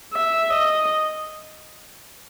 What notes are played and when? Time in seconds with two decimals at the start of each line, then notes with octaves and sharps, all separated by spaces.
0.14 E5
0.53 D#5